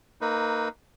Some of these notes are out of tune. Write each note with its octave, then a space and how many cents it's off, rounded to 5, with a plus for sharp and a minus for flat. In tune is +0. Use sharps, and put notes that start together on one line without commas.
A#3 -20 D#4 +0 B4 +0